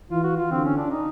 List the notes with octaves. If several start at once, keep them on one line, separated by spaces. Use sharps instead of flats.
E3 F4
F#4
F4
D3 C4
C#4
D4
D#4